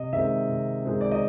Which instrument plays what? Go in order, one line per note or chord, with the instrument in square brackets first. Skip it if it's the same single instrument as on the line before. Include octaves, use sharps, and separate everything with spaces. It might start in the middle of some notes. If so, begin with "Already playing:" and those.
Already playing: [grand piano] C3 D#5
D#3 G#3 C4 E5
C3
D#3 G#3 C4
D5
D#5